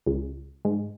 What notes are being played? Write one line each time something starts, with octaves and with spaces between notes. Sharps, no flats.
C#2
G#2